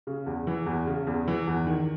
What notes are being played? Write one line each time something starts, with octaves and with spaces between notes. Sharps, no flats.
C#3
E2
E3
E2
C#3
E2
E3
E2
D#3